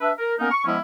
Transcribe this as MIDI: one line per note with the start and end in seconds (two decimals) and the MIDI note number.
0.01 0.12 62
0.01 0.12 71
0.01 0.12 76
0.19 0.34 70
0.39 0.50 58
0.39 0.50 59
0.39 0.50 61
0.39 0.50 63
0.39 0.50 70
0.51 0.64 85
0.65 0.78 53
0.65 0.78 56
0.65 0.78 59
0.65 0.78 61
0.65 0.78 64